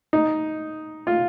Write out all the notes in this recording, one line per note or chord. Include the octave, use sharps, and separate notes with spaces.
D#4
F4